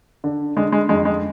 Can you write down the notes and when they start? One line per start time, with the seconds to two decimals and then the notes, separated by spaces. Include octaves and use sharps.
0.24 D3
0.56 D3 G#3
0.72 G#3
0.89 F2 G#3
1.05 G#3